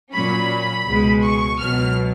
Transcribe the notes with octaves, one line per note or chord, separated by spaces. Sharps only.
A#2 F#3 C#4 B5
C#2 B2 G#3
C#6
C#2 B2 F#3 F6